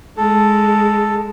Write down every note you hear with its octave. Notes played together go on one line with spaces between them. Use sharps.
G#3 A4